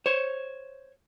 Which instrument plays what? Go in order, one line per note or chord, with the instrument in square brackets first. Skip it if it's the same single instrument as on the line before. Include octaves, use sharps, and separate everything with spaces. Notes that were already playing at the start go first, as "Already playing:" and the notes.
[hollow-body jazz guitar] C5 C#5